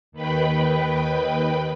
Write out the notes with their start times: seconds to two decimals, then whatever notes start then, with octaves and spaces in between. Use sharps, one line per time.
0.12 D#2 D#3 B4 G5 B5